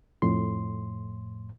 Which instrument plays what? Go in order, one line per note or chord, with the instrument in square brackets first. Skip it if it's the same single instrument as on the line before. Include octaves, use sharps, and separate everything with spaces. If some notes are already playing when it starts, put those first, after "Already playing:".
[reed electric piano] F2 A2 C6